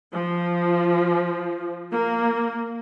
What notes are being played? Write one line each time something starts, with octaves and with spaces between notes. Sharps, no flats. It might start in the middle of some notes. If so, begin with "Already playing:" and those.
F3
A#3